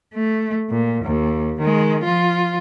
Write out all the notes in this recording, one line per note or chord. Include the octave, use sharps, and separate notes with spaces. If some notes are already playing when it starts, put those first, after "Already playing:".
A3
A#2
D#2
D#3 G#3
F3 F4